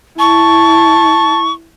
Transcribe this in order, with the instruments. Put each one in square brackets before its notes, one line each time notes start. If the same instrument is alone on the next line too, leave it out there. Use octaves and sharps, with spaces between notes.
[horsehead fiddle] E4 [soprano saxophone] A5 [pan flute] C#6